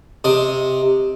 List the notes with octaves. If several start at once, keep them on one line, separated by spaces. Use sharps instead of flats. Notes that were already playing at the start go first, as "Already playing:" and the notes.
C3 D#5